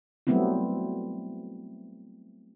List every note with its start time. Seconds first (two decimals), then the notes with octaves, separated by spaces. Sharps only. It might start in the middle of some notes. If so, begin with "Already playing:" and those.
0.27 F#3 G3 A3 B3 C4 E4